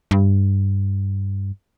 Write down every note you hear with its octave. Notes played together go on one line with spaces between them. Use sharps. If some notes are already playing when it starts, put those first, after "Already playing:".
G2